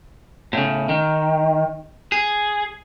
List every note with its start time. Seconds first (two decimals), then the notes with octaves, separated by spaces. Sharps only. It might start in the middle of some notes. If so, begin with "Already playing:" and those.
0.53 A2 C#3
0.89 D#3
2.12 G#4